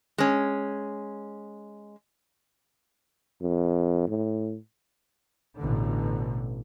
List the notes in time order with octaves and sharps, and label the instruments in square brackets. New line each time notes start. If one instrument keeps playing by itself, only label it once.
[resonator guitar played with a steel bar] G#3 C#4
[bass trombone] F2
A2
[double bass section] A1 B2 D3